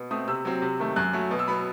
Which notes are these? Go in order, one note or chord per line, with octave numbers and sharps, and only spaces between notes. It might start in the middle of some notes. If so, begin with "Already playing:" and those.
Already playing: B2
A3 C4 D#6
C3 E6
F#3 C4
C3
D#3 A3
F#2 F#6
F#3 A3
B2
E6
F#3 B3 B5